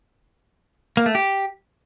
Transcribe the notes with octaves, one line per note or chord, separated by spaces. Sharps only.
A#3
A3
G4